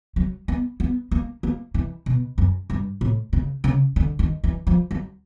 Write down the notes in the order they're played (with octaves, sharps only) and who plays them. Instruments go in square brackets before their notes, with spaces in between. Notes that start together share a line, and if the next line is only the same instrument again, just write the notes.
[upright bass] F#3
B3
B3
A#3
A#3
E3
B2
F#2
G2
A2
C#3
C#3
D3
D#3
E3
F3
F#3